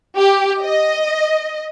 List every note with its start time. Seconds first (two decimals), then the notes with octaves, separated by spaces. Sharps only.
0.18 G4
0.63 D#5